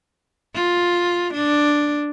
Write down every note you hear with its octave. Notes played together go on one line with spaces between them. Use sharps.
F4
D4